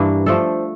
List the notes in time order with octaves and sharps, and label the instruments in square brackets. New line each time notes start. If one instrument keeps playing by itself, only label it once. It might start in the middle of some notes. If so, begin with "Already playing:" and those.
Already playing: [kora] G2 E3 A#3 D4
F3 A3 D4 A4